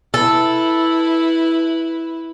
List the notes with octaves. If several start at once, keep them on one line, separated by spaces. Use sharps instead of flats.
E4 A4 B4